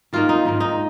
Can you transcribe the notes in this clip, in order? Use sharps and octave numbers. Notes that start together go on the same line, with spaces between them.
D#3 A#3 D#4 F4
D#4
G#2 D#3 A#3 D#4
D#4